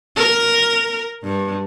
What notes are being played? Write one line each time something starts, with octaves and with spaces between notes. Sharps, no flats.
A#4
G2